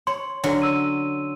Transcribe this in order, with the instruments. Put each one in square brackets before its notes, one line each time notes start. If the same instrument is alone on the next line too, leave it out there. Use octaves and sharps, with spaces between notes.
[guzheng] C#5 [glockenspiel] C6
[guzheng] D3 F#3 C#4
[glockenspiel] E6 D#7